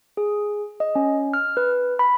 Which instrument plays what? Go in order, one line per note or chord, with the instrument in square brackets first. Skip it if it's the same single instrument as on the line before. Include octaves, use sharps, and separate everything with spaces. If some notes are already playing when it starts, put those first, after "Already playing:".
[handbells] G#4
D#5
C#4
F6
B4
B5